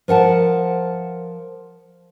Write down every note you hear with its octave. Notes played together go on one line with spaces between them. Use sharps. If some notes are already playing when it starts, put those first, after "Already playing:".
F3 A#4 F#5 A5